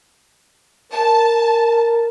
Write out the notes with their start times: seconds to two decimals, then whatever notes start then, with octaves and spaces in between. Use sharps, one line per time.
0.92 A#4 A5